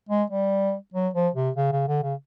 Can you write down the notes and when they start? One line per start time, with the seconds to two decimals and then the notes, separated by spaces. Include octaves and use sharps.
0.09 G#3
0.30 G3
0.93 F#3
1.14 F3
1.35 C3
1.56 C#3
1.72 C#3
1.88 D3
2.03 C#3